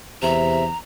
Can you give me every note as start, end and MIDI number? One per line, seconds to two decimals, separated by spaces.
0.22 0.70 40
0.22 0.64 48
0.22 0.64 76
0.22 0.78 82